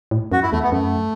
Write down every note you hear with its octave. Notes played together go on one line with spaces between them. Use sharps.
A2
F#2 F#4
E4
E2 A3
B3
F#2 A3